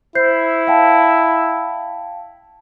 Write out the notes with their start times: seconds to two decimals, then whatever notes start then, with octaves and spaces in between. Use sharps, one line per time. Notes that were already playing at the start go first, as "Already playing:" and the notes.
0.15 E4 C5 G6 C7
0.67 F5 G5 A5